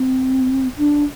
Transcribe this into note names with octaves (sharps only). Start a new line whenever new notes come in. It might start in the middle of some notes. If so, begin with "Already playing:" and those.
Already playing: C4
D4